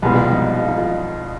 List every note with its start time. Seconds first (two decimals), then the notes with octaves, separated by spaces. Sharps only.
0.02 C2 B2 G3 G#3 B3
0.12 F3
0.20 G3
0.31 D#4
0.59 F4
0.68 D#4
0.78 F4